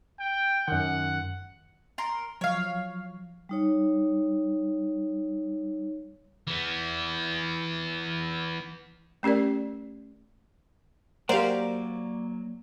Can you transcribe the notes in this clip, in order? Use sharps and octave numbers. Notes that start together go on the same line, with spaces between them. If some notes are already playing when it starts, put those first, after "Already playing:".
G5
F#2 D#3 F#5
A#4 C6
F3 F#3 C#5 F5
G3 D#4 C#5
E3 B3
A3 C#4 G4 A#4 D5
F#3 A#3 G4 A#4 C5 D5 F5 F#5